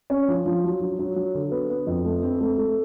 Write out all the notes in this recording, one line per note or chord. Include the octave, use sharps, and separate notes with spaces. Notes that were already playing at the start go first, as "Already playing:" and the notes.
C#4
F3
F3
F#3
F#3
F#3
F#3
D3
B3
B3
F2
A3
C4
A3
A3